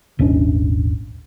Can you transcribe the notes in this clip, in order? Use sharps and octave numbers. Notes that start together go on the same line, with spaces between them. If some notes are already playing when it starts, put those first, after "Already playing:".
D#1 G#1 C#4 D4